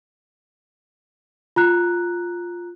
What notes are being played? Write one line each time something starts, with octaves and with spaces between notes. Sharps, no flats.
F4 A#5 F#6